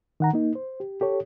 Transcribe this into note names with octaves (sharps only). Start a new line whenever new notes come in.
D#3 F#5 A#5
A#3 D#4
C5
G4
G4 A4 C#5